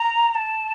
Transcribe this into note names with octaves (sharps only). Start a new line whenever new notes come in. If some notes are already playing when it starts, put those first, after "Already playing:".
Already playing: A#5
A#5
A5